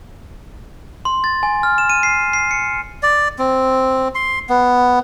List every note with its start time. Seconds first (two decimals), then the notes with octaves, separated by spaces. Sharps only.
1.05 C6
1.24 A6
1.43 G#5
1.63 F6
1.78 E7
1.89 D#7
2.03 C7
2.33 C7
2.51 C#7
3.03 D5
3.39 C4
4.15 C6
4.49 B3